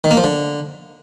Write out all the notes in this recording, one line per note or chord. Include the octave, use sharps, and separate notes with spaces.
D#3
A#3
F3
D3